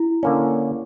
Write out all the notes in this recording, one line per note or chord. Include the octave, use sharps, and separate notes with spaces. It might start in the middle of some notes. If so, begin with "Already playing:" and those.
Already playing: E4
D3 A#3 C#4